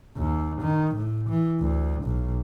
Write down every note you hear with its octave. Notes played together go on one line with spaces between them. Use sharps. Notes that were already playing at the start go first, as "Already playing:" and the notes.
D#2
D#3
A2
E3
D2
B1